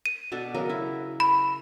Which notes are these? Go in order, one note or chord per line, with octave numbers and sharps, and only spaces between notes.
D#7
B2 D4 A4
C#3 F#3 A#4
E4
B5